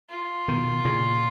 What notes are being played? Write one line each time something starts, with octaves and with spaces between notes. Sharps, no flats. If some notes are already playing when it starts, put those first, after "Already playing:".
F4
B2 D#3
A#2 C#3